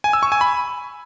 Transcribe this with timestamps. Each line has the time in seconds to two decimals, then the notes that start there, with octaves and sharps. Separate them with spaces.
0.04 G#5
0.13 E6
0.23 C#6
0.32 G#5
0.41 B5